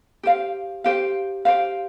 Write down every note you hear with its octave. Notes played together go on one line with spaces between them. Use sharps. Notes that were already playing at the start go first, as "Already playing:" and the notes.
G4 C5 F5
G4 C5 F5
G4 C5 F5